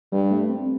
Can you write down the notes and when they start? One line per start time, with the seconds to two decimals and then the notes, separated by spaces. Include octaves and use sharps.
0.13 G2 G3
0.31 A3
0.50 C4